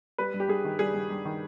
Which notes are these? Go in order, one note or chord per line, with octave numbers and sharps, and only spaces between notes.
G3 B4
G2
G4
G2 G#4
D#3
G3 G#4
G2
G2
D#3